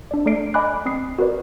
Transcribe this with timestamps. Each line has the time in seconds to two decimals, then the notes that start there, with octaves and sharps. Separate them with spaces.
0.11 D4 D5
0.26 A3 A4 D5 F6 C7 D7
0.54 D#5 G#5 B5 D6 F#6
0.86 C4 D#6 C7
1.18 F#4 A#4 B4 D5